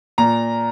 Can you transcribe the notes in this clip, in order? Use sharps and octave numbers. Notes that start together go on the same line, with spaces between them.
A#2 A#5